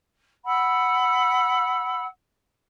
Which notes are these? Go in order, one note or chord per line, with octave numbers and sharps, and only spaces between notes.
F#5 B5 E6